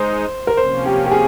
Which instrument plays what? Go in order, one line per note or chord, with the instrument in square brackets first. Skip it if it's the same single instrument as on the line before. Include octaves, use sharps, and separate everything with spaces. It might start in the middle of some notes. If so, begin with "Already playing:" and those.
Already playing: [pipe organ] G#3 D#4 [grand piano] C5
[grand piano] A#4
[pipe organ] C3 F3 A#3 C#4 [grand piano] C5
[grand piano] G4
G4
G#4